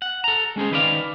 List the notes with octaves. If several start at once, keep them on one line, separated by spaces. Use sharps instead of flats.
F#5
A4 A#5
G#3 C#4 G#4 C5
D#3 B4 D5 F5